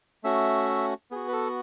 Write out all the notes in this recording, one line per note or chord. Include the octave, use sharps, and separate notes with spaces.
A3 C#4 F#4 E5
B3 F#4 G#4
B4
A4